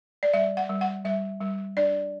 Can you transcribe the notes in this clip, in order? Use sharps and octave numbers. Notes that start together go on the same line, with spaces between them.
D5
G3 E5
F#5
G3
F#5
G3 E5
G3
D4 D5